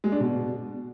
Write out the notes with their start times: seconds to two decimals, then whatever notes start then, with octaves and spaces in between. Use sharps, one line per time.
0.04 G#3
0.12 D4
0.20 B2